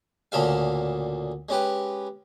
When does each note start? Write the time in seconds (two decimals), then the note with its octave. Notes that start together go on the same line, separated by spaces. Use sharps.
0.32 D2 A#2 C#3 A4 E5 F5
1.49 G#3 C#4 G4 B4